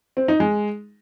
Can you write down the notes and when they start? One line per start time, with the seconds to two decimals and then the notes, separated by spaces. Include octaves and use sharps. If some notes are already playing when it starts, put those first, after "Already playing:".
0.17 C4
0.28 D#4
0.40 G#3